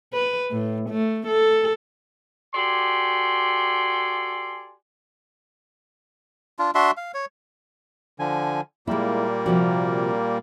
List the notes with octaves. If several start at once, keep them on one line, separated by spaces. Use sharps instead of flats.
B4
A2
A3
A4
F#4 G4 A4 D5 G#5 C6
D4 F4
D4 F#4 E5 C6
F5
C#5
D3 F3 G#5
A#2 G3 G#3 A#3 E4
C3 F3 F#4